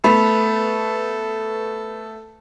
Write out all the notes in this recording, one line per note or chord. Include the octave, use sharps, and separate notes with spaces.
A3 B3 A4 B5